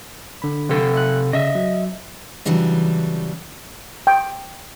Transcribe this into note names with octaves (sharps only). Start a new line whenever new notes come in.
D3 B5
C3 A4
E5 F#6
C#3 D#5 E5
F#3
C#3 E3 F#3 G3 D4
G5